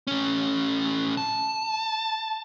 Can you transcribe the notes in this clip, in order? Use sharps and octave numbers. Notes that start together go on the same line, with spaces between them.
A2 C#4
A5